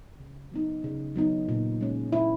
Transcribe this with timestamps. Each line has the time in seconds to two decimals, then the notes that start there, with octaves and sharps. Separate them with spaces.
0.20 C#3
0.51 F#3 B3 D#4
0.84 C#3
1.16 F#3 B3 D#4
1.49 A#2
1.81 G#3 C#4
2.12 A#2 E4